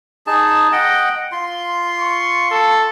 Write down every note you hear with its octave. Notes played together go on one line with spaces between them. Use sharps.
D#4 G#4 A5
D#5 F#5 G5
F4 C6
C#6
A4